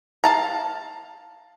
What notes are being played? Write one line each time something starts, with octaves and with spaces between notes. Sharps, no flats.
F5 A5 A#5